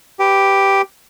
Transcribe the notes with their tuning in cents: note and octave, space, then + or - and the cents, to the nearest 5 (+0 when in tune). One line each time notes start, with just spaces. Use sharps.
G4 +0 B4 +10